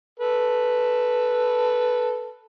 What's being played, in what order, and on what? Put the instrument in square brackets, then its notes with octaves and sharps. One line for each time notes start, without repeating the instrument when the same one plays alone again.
[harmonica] A4 B4